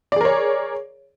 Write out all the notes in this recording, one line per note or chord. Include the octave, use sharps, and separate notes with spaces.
G#4 A#4 C#5 D5